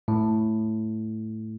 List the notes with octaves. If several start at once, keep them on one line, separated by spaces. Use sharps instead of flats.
A2